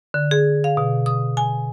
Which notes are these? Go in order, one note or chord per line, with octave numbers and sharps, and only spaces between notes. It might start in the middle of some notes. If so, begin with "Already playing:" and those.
D3
G#4
F5
B2
D#6
G#5